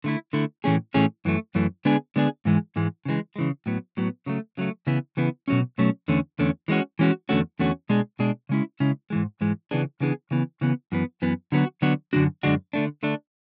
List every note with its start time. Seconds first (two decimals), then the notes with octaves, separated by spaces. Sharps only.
0.04 D3 A3 E4
0.33 D3 A3 E4
0.64 A2 E3 A3 C#4 G#4
0.94 A2 E3 A3 C#4 G#4
1.25 F#2 E3 A3
1.55 F#2 E3 A3
1.85 D3 G#3 B3 D4 G#4
2.16 D3 G#3 B3 D4 G#4
2.45 G#2 E3 G#3
2.76 G#2 E3 G#3
3.05 C#3 E3 G#3
3.36 C#3 E3 G#3
3.66 A2 F#3 B3
3.97 A2 F#3 B3
4.26 C#3 F#3 A3
4.57 C#3 F#3 A3
4.87 C#3 E3 B3 E4
5.17 C#3 E3 B3 E4
5.48 B2 F#3 A3 C#4
5.78 B2 F#3 A3 C#4
6.08 E2 D3 A3 C#4
6.39 E2 D3 A3 C#4
6.68 E3 G#3 C#4 F#4
6.99 E3 G#3 C#4 F#4
7.29 E2 D3 A3 C#4 F#4
7.59 E2 D3 A3 C#4 F#4
7.89 B2 G#3 D4 G#4
8.19 B2 G#3 D4 G#4
8.49 C#3 G#3 C#4 E4
8.80 C#3 G#3 C#4 E4
9.10 G#2 E3 G#3
9.41 G#2 E3 G#3
9.71 C#3 E3 B3 D4 G#4
10.00 C#3 E3 B3 D4 G#4
10.31 C#3 E3 B3
10.61 C#3 E3 B3
10.92 F#2 E3 B3
11.22 F#2 E3 B3
11.52 D3 F#3 B3 F#4
11.82 D3 F#3 B3 F#4
12.13 F#2 D3 G#3 D4 F#4
12.43 F#2 D3 G#3 D4 F#4
12.73 D3 A3 D4
13.03 D3 A3 D4